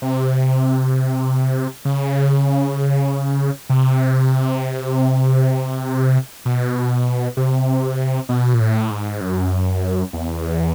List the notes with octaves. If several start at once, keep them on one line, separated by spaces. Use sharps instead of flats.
C3
C#3
C3
B2
C3
B2
A#2
A2
G#2
F#2
E2